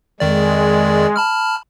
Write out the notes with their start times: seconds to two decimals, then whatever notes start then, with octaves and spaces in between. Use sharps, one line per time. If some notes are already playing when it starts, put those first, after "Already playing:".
0.20 F2 D#3 G#3 D5
1.16 A5 B5 F6